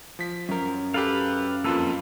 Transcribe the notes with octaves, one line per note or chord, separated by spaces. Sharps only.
F3 B6
F#2 A#4
G4 A4 B4 F5
F2 A#3 F4 A4 B4 E6